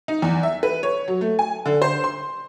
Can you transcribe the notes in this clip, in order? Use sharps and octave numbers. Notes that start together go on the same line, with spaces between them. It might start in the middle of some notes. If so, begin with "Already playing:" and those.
D#4
E2
E5
B4
C#5
F#3
A3
G#5
D3
C5
C6